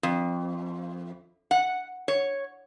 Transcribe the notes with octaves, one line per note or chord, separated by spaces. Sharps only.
F2
F#5
C#5